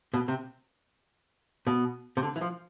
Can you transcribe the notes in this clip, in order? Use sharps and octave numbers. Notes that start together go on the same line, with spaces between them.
B2
C3
B2
C3
D3
E3
F3